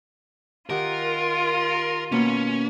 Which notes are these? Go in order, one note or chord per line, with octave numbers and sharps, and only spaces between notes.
D#3 F4 G4 A#4 F#5
B2 A#3 C#4